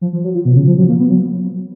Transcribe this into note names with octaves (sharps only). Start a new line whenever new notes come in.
F3
F3
F#3
F3
B2
C#3
F3
F#3
A#3
B3
F#3